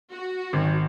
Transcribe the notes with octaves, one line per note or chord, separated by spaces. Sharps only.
F#4
G#1